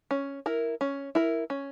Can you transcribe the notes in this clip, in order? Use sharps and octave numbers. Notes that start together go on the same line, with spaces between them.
C#4
E4 A#4
C#4
E4 A#4
C#4